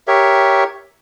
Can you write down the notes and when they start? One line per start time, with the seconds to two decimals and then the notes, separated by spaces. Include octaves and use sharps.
0.08 G4 A#4 C#5 E5